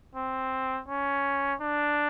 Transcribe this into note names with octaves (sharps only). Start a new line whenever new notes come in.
C4
C#4
D4